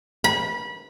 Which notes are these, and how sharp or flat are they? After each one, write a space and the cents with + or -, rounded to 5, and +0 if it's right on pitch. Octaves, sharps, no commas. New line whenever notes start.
B5 -25